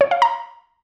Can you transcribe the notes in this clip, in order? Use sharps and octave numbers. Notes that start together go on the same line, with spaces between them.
C#5
F5
A#5